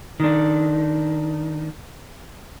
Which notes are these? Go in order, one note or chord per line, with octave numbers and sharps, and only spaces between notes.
D#3 D4